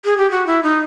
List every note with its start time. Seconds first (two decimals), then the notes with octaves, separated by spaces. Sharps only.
0.05 G#4
0.18 G4
0.31 F#4
0.47 E4
0.63 D#4